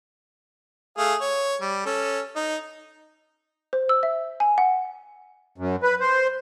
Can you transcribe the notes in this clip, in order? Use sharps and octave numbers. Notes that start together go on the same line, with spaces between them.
A3 G#4 F5
C#5
G3
C#4 A4
D#4
C5
E6
E5
G#5
F#5
F#2
B4
C5